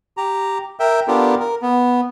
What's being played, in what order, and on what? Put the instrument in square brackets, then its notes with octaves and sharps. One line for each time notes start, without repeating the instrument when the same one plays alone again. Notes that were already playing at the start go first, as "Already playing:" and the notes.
[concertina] G4 A#5
A#4 E5 G5
B3 D4 F4 G4 A4 A#4
A#4
B3